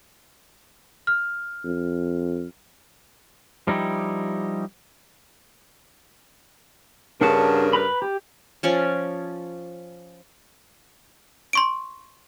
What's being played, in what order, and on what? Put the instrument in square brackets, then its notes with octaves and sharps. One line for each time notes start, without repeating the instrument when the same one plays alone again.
[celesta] F6
[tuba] F2
[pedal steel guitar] F3 G3 D#4 E4 G4
[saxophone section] G2 C#3 A#4 [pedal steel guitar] D4 F#5 A5
[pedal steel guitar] B4 A#5 B5
G4
[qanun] F3 C#4 C#5 D5
[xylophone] C6 C#6 D7